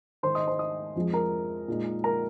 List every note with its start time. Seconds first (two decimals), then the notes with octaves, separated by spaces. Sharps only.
0.23 G#2 D#3 G#3 C5 C6
0.35 D#5 D#6
0.47 C5 C6
0.59 D#5 D#6
0.96 F2 F3 G#3
1.13 A#4 A#5
1.68 A#2 G#3 D#4
2.04 A#4 A#5